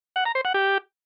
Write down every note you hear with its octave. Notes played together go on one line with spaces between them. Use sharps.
F#5
A#5
C5
F#5
G4